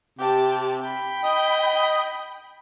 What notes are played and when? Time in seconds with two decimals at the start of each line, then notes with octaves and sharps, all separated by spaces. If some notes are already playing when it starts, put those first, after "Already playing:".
0.19 C3 G4 A5
0.80 G5 B5
1.23 D#5